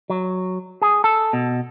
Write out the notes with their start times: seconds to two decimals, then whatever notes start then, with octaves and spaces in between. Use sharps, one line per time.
0.10 F#3
0.82 G#4
1.04 A4
1.33 B2